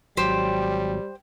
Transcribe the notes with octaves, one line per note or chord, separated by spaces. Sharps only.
G#1 F#3 G3 G4 C5